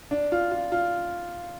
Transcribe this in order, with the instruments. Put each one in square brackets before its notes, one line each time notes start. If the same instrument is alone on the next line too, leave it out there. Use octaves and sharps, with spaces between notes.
[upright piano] D4
F4
F4
F4